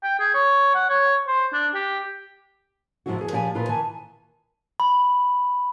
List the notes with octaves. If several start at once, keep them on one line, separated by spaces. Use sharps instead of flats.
G5
G#4
C#5
F#5
C#5
C5
D4
G4
G#2 C3 F3 G#3 E4 F#4
E2 G#4
A#2 F3 G4 D5 G5 G#5
A#2 E4 F4 B4 D#5
D#3 E3 G#5 A5
B5